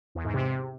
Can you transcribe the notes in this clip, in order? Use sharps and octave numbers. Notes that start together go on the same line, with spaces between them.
E2
G#2
C3